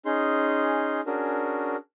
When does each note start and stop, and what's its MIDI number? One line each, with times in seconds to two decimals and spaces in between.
0.06 1.01 61
0.06 1.01 63
0.06 1.01 68
0.06 1.01 84
1.06 1.76 61
1.06 1.76 62
1.06 1.76 66
1.06 1.76 68
1.06 1.76 70